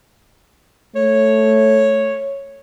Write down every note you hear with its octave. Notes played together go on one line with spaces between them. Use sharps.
A3 C#5